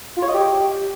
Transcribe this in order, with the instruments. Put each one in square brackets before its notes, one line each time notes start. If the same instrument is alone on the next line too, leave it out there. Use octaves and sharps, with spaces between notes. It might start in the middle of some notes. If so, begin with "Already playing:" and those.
[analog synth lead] F4
C#5
D#5
G4